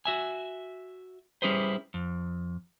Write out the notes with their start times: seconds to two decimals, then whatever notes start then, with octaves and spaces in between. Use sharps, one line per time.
0.05 F#4 E5 G#5
1.42 G3 C#4 E4 G#4 B4 C5
1.94 F2